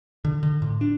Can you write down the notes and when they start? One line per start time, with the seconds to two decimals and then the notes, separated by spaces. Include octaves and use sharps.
0.25 D3
0.43 D3
0.62 A2
0.81 D4